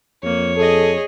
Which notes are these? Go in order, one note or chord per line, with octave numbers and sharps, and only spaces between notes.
F2 A#3 C#5
G#4 A4 D#5